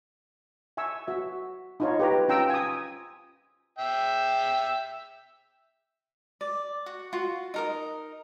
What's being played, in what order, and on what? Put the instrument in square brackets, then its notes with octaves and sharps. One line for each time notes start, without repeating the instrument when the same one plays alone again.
[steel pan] E5 G#5 C#6 E6
F#4 E5
D#4 F4 C#5
G4 B4 A#5
C#4 F4 G5 A#5 E6
G#5 D#6
[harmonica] E5 G5
[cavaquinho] D5
F#4
F4 F#4
D#4 A#4 D#6